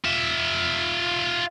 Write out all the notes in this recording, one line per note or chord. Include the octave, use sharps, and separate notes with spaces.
F4 E5